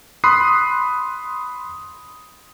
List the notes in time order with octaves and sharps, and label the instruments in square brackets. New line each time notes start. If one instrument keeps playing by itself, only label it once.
[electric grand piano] B5 C6 D#6 F#6 C7